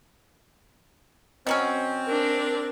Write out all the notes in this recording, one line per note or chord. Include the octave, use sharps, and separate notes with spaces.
B2 F#3 C4 C#4
D4 A#4